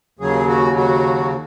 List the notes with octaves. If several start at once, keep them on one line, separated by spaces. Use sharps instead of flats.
D#2 C#3 F#3 G#4
F#4
F#4